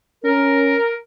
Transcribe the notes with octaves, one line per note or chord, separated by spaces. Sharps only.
C#4 A#4